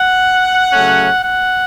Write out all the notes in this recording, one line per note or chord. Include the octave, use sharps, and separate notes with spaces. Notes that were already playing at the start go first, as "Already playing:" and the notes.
Already playing: F#5
C#3 F#3 A3 C#4
F#5